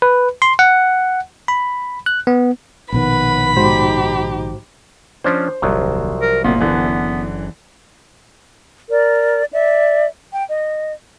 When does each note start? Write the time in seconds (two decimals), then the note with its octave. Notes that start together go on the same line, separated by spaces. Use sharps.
0.02 B4
0.42 C6
0.59 F#5
1.48 B5
2.06 F#6
2.27 B3
2.92 A#1 B2 D#3 B4 F#5 B5
3.57 G#2 D#4 F#4 G4 C5
5.24 F3 C#4 D4 C5
5.62 D#1 C2 F3 F#3
6.22 A#4
6.44 F#1 A#2 B3
6.60 D3 E3 B3
8.89 A#4 D5
9.52 D5 E5
10.31 G5
10.48 D#5